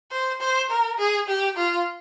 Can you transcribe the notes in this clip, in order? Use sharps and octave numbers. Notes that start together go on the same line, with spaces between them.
C5
C5
A#4
G#4
G4
F4